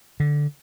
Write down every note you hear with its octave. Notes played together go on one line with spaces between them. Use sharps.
D3